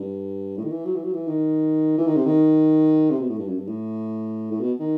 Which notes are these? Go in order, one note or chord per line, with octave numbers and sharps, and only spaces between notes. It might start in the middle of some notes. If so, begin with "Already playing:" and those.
Already playing: G2
A2
D#3
E3
F#3
E3
F#3
E3
D#3
E3
D#3
C3
D#3
C3
B2
A2
G2
F#2
G2
A2
A2
B2
D#3